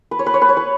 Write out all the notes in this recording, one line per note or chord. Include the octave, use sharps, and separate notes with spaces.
B4
C#5
B4
C#5
B4
C#5
B4